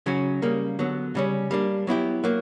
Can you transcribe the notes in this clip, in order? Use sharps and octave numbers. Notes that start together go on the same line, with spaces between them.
C#3 F#3 C#4 F#4
C#3 G3 A#3
D3 F#3 B3
C#3 G3 C#4
G3 A#3 D4
F#3 B3 E4 G4
F#3 A#3